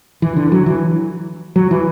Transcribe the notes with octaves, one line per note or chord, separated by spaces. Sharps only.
E3
D3
F#3
E3
F#3
E3